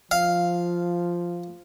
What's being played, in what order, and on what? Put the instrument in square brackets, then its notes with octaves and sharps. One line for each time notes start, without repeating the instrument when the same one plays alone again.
[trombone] F3 [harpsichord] F5